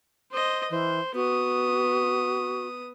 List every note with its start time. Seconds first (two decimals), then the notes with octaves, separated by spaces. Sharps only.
0.32 C5 D#5
0.70 E3 C5
1.15 B3 F#4 D#6